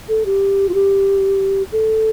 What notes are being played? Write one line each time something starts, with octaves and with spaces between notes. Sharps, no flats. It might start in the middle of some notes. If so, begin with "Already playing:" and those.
A4
G4
F4
G4
A4